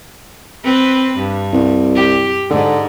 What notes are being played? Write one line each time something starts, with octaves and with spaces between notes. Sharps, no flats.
C4 B4
G2
C2
G4
G#2 D3